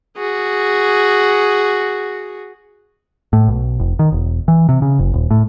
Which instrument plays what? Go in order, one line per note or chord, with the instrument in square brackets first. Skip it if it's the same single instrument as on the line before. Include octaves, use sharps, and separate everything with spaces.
[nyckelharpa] F#4 G#4
[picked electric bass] A2
B1
F1
D#3
E1
E3
C3
C#3
F#1
D#1
A2